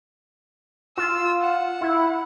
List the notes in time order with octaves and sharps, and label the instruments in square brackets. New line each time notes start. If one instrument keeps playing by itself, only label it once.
[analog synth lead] F4 [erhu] E6
[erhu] F#5
[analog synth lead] E4